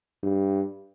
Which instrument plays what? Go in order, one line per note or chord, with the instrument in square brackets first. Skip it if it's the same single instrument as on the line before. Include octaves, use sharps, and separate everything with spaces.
[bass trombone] G2